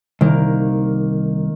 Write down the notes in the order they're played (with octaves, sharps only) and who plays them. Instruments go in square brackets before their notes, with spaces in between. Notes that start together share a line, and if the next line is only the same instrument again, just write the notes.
[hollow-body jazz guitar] C2 [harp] D#3 A#3